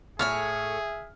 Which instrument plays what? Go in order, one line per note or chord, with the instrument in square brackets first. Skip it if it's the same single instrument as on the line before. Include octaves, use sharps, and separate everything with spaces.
[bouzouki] A2 C#5 G#5 [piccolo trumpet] G#4 [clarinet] E5 [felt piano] F6